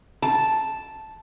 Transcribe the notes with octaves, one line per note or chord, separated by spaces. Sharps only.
A5